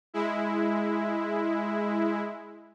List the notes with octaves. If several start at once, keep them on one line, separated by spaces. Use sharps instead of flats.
G#3 E4